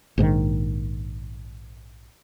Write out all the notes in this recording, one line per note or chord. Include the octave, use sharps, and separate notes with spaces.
A#1 G#2 B2 D#3